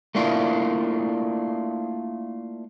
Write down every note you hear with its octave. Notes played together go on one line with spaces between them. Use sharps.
A3 A#3 D4 E4 F4